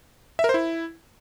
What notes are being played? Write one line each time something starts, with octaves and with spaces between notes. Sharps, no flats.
E5
A#4
C5
E4